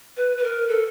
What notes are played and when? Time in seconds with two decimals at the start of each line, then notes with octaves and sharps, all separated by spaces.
0.17 B4
0.37 B4
0.44 A#4
0.69 A4